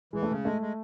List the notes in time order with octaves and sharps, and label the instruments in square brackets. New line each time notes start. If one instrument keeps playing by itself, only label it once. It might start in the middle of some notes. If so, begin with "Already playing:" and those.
[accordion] E3 [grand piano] G#3
[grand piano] A3
[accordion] C#3 [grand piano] G#3
[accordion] G#3 [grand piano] A3
[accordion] G#3